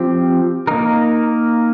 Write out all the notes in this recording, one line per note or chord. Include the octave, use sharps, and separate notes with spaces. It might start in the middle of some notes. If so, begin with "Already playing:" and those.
Already playing: F3 C4 G4
A#3 D#4 A#4